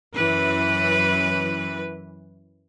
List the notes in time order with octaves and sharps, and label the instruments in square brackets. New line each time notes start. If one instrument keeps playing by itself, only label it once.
[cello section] F#2 E3 B4